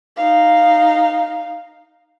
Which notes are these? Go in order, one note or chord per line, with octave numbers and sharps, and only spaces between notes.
D#4 F5